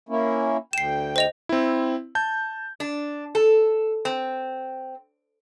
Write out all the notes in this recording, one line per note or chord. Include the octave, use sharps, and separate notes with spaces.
A#3 C#4 E4
D2 G5 C7 E7
C5 D#5 F7
C4 E4
A5 G6
D4
A4
C4